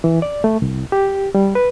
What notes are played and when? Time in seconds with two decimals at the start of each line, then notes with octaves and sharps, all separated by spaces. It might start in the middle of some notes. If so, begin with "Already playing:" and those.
0.04 E3
0.22 D5
0.44 A3
0.62 C2
0.92 G4
1.35 G3
1.55 B4